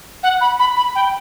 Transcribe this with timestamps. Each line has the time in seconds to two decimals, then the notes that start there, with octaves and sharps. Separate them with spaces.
0.23 F#5
0.41 B5
0.59 B5
0.76 B5
0.95 G5